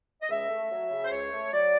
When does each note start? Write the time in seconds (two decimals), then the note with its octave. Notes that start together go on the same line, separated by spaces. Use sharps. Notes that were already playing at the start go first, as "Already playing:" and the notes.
0.21 D#5
0.29 C#2 E5
0.49 A3
0.71 F#3
0.91 C#3
1.04 C5
1.11 C#2 C#5
1.32 A3
1.52 F#3 D5